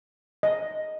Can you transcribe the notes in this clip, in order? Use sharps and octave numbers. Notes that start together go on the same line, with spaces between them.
D#5